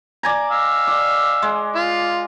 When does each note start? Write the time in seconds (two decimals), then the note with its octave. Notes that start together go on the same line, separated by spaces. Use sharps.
0.23 D5 G#5 A#5
0.51 F5 E6
0.87 D5
1.42 G#3
1.75 F4